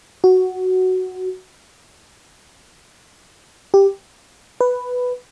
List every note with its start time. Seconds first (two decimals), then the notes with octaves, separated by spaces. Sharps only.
0.24 F#4
3.74 G4
4.61 B4